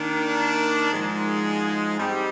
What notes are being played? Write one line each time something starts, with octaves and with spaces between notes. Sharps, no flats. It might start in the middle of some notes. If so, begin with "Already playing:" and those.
Already playing: D#3 A#3 D4
G#2 F3 G#3
G3 C4 D#4 G4